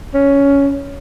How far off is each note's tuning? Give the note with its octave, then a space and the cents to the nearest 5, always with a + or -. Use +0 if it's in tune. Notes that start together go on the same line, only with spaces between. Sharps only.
C#4 +10